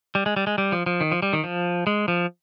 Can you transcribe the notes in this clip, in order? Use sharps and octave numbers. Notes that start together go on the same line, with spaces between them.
G3
G#3
G3
G#3
G3
F3
F3
D#3
F3
G3
D#3
F3
G#3
F3